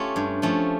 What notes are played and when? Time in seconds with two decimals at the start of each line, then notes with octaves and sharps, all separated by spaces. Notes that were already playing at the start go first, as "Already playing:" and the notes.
Already playing: A3 C#4 F4 G4
0.16 G2
0.42 F3 A3 C#4